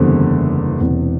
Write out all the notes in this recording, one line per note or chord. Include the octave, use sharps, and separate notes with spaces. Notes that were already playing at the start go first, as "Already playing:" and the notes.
Already playing: F#1 E2 D3 G3 C4
E1 E2 C3